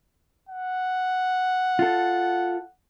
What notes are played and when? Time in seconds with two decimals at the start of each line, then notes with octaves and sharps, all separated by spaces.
0.49 F#5
1.79 F4 A4